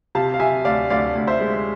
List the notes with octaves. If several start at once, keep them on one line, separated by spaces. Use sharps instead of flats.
C3 F5 A5
F5
C3 E5 G#5
D2 D5 F5
D2 D5 F5
D2
C5 E5
G#3